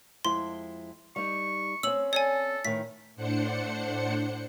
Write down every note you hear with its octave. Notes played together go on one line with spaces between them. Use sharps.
F2 G#3 E4 C6
G3 D#4 C#6
C4 C#4 E6 F#7
A4 C#5 D5 G#5
A2 D#3 B6
A2 D4 C5 F#5 C#7